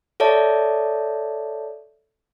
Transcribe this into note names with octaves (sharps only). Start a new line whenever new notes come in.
A4 C#5 D5 E5 A5